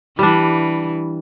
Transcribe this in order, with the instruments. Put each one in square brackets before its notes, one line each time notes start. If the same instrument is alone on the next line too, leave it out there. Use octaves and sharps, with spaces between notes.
[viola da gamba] E3 [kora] G3 D4